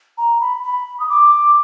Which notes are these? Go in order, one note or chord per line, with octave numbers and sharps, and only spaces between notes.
A#5
B5
B5
D#6
D6